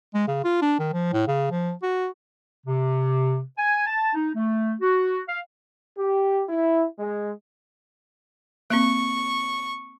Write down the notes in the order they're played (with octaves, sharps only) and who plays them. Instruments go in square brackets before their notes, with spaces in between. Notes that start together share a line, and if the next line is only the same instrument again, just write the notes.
[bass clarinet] G#3
C#3
F4
D4
D#3
F3
A2
C#3
F3
F#4
[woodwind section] C3
G#5
A5
D#4
A3
F#4
F5
[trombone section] G4
E4
G#3
[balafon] A#3 C4 [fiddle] C#6